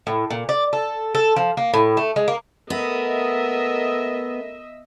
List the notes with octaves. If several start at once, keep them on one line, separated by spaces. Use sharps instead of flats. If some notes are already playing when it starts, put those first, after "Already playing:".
A2
A#2
D5
A4
A4
F3
A#3
A2
A3
G#3
A#3
A3 B3 A4 A#4 D#5 E5